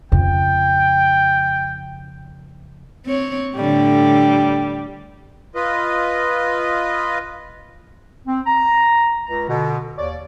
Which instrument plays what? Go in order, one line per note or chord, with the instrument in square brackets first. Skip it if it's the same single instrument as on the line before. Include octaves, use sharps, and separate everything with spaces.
[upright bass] F2 C#3 [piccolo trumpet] G5
[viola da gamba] C4 C#5
[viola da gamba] A2 D3 [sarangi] G3
[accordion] F4 B4 D#5
[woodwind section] C4
A#5
C#2 A#5
B2 D3
D#2 C#5 D5